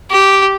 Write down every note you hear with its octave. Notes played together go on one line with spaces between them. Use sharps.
G4